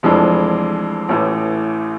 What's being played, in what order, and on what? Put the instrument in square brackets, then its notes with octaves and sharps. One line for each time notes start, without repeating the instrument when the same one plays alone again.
[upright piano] F1 F2 E3 G#3 D4
A1 A2 E3